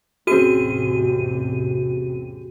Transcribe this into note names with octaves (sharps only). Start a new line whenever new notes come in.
A1 E2 C3 C4 C#4 F#4 G#4 D#7